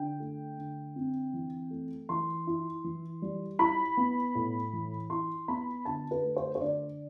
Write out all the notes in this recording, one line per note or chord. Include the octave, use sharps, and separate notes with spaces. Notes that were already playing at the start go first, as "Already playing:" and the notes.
Already playing: D3 G5
A3
D3
C4
E3
A3
E3 C6
E4
E3
G3
E4 B5
B3
A2
E3
E4 C6
B3 B5
D3 A5
B4
A3
C5
C5
D3 D5